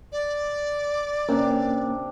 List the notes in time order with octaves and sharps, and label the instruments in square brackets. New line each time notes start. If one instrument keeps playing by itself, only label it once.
[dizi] D5
[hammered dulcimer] C3 D4 [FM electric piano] A#3 C#4 A#4